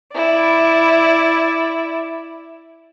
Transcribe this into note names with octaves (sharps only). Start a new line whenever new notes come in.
E4 D5